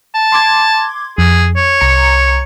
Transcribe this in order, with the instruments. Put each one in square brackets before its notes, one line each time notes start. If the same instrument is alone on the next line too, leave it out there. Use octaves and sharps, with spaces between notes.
[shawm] A5
[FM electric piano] C6 D6 G#6
[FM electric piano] F2 [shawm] G#4
[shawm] C#5
[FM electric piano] C2 A#5 C#7